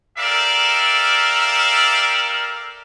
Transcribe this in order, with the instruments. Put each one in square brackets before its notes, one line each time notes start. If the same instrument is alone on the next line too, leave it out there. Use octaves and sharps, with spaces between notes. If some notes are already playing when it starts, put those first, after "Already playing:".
[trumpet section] G4 A4 A#4 D5 E5 F5